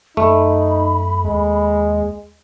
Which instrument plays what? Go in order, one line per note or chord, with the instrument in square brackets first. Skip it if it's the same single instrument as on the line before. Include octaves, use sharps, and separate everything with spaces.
[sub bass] F#2 [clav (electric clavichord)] A3 [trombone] D#4 [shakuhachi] B5
[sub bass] D#2 [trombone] G#3